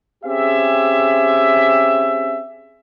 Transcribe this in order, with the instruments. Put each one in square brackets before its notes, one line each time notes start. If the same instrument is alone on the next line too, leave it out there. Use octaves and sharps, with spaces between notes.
[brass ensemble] C4 C#4 G4 G#4 E5